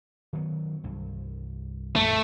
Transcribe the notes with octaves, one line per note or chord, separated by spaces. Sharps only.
D#3 F#3 B3
C2 G2
A#1 F#2 E3 A3